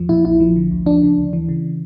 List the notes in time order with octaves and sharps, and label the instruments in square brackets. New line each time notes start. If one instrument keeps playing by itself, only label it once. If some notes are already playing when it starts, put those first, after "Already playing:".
Already playing: [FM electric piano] E2 F3
A#2 E4
A#1 E4
F3
D3
D2
F3 D4
C#3
D2
E3
C#3